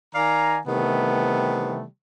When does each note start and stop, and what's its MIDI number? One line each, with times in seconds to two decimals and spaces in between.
0.15 0.59 51
0.15 0.59 74
0.15 0.59 77
0.15 0.59 80
0.15 0.59 82
0.67 1.85 48
0.67 1.85 51
0.67 1.85 52
0.67 1.85 55
0.67 1.85 57
0.67 1.85 59